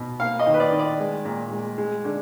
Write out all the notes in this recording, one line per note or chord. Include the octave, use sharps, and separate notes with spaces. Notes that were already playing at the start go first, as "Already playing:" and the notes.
Already playing: B2
A#3 F5
D#5
D#3
B4
D5
D#3
D5
G#3
A#2
G#3
G#3
D3